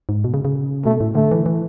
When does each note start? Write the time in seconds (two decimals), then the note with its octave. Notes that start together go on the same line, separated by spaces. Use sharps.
0.09 G#2
0.24 B2
0.34 C#3
0.45 C#3
0.85 B2 A3
1.01 A2
1.15 D3 A3
1.31 E3
1.46 E3